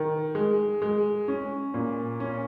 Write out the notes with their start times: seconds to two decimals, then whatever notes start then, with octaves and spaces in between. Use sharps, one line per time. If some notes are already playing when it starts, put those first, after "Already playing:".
Already playing: D#3
0.35 G#3
0.82 G#3
1.28 C#4
1.74 A#2
2.20 C#4